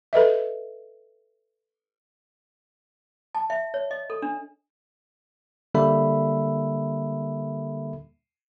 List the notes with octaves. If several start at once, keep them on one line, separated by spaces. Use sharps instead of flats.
A4 B4 D#5 E5
A5
E5
C#5
D#5
A4
D4
D3 G3 A#3 A4 E5 B5